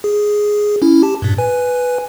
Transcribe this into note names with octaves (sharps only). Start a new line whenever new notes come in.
G#4
C#4 E4
G4 A5
G2 A#2
B4 G#5